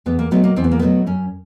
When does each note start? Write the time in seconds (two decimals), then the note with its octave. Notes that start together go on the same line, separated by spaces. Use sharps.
0.06 E2 B3
0.19 A#3
0.31 B2 F#3 A3 B3
0.44 A#3
0.56 E2 C4
0.64 B3
0.71 A#3
0.79 B2 F#3 A3 B3
1.06 F#2 C#4